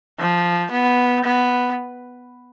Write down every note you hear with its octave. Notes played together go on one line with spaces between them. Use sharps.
F3
B3
B3